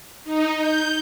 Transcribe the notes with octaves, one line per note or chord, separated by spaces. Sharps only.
D#4
G6